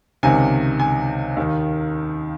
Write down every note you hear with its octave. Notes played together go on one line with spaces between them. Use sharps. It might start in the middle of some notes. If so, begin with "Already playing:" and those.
C#2 C3 D#3 G#5
G#5
D#2 D#3